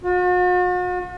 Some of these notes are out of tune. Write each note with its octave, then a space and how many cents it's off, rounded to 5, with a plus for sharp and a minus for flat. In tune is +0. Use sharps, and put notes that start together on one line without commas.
F#4 -45